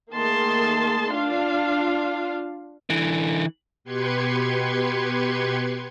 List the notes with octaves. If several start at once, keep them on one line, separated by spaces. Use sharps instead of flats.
D#3 A3 A#3 G#4 A5 C6
D4 F4 F5
D3 E3
B2 G4 B4 C6 G#6 C#7